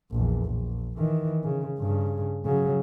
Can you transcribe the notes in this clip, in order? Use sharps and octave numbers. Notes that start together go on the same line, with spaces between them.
A#1 E2
A#1
D#3 E3
C#3
G2 C#3
C#3 F#3